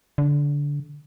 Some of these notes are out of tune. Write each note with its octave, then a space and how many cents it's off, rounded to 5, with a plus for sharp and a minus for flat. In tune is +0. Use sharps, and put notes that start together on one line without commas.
D3 -20